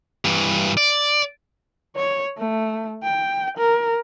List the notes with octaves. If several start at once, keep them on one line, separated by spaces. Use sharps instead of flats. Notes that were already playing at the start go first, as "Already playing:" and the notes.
G2 E3
D5
C#5
A3
G5
A#4